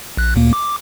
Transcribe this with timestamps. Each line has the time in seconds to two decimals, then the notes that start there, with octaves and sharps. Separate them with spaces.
0.17 A#1 F#6
0.36 D2 A#2 A#3
0.53 D6